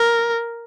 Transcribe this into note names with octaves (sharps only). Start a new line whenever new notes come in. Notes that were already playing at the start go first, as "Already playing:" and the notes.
Already playing: A#4